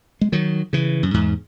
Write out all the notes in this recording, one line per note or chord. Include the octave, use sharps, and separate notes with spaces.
G#3
D#3 F#3
C#3 E3
F#2
E2 G#2